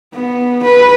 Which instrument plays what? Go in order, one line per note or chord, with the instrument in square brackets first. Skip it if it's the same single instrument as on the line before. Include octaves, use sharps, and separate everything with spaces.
[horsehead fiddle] B3
B4